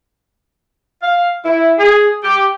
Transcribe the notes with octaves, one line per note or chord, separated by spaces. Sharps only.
F5
E4
G#4
G4